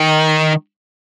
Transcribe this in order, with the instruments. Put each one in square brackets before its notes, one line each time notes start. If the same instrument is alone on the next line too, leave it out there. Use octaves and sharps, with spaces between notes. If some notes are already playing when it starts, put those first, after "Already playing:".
Already playing: [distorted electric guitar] D#3